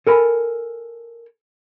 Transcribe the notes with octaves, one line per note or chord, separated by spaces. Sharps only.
A4 A#4 G#5 B5